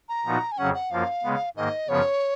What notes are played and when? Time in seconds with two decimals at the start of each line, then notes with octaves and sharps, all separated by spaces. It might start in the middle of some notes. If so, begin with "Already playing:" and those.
0.09 A#5
0.25 A#2 F3 B3 D#4 F#4
0.52 G#5
0.58 F2 C#3 F#3 C#4 F#5
0.74 F#5
0.91 F#2 F3 A#3 F4 F5
1.24 C#3 G#3 B3
1.56 G#2 D#3 A#3 D#5
1.89 F#2 C#3 F3 B3 C#5